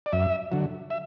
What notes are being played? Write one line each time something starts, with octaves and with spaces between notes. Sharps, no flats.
D5
F#2 E5
D3 F#3
E5